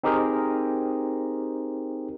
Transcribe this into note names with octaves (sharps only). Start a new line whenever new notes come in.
C4 D#4 G4 G#4 A#4 C5